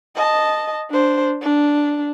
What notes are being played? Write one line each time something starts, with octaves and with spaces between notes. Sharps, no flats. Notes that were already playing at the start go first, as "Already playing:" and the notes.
D#5 A5
D4 C5
D4